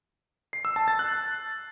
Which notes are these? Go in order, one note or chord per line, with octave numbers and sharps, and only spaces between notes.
C7
E6
A5
A6
F#6